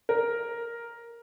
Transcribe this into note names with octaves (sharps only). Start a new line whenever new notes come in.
A#4